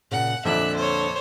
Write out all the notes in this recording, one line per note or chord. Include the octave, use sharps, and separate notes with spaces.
A#2 C#3 F#5
F2 A#2 D3 E5 D6 F#6
C5 C#5